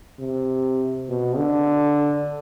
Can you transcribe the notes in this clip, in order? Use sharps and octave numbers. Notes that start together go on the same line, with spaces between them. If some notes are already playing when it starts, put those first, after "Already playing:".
C3
B2
D3